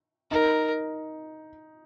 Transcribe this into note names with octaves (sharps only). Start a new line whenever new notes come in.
D#4 A#4